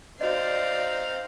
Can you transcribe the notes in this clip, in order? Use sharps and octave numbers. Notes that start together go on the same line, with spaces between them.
C4 D#4 F#4 C5 D5 D#5 F5